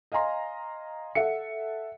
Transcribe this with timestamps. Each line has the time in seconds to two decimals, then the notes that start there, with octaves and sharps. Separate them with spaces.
0.12 D#5 F5 G#5 A#5 C6
1.15 A4 E5 F#5 C#7